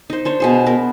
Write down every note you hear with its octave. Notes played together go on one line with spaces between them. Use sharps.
D#4 C5
D4 C5 C#5
B2 G#4 C5
B3 A#4